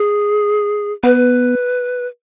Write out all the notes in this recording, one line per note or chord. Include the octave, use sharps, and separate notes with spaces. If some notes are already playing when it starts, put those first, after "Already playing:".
Already playing: G#4
B3 B4